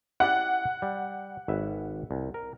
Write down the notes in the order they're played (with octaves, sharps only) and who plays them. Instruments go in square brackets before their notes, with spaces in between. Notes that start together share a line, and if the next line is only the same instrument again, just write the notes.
[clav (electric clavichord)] E4 G4 D5 [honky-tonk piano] F#5
[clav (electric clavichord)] G3
G#1 B4 E5
C2
A#4